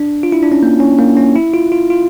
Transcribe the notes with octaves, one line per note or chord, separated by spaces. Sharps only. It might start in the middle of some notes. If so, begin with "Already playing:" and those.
Already playing: D4
F4
E4
D4
C#4
A#3
C#4
A#3
C#4
E4
F4
F4
F4